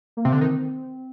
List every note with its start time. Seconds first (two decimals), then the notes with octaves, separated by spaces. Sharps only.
0.17 A#3
0.25 C3 C4
0.32 D3
0.41 D#3